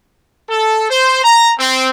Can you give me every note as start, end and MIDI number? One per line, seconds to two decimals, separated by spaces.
0.49 0.85 69
0.89 1.22 72
1.23 1.50 82
1.58 1.89 60